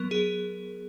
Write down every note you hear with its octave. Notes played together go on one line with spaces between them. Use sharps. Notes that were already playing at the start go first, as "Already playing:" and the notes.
Already playing: F#3 B3 A#4
G#4